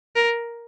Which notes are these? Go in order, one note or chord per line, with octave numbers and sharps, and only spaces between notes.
A#4